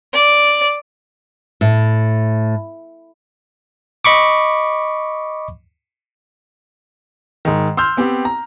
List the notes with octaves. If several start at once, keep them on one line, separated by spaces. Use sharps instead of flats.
D5
A2
D#5 B5 C#6 D6
G#2 D#3
C6 E6 F6 G6
B3 C4 G4
A#5